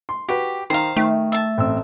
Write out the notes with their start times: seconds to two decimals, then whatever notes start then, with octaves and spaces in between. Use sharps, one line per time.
0.09 C6
0.29 F#4 G4 B4
0.70 D#3 C5 F5 A#5
0.97 D#3 A3
1.32 E5 A5
1.58 A1 C4 E6